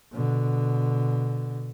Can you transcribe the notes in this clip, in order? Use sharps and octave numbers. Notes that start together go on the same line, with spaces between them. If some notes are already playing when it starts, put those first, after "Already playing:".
B2 D3